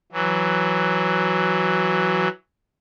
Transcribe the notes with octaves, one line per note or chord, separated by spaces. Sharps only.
E3 F#3